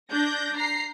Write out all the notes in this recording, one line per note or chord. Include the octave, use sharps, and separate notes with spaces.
D4 G6 A#6
A#5 C7